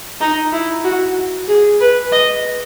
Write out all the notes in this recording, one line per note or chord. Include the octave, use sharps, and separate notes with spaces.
D#4
E4
F#4
G#4
B4
D#5